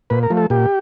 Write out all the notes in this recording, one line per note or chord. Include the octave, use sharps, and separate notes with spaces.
A#2 B4
A#4
F3 A3
A4
A#2 G4